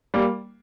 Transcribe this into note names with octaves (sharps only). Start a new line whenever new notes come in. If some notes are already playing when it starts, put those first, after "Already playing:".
G3 A#3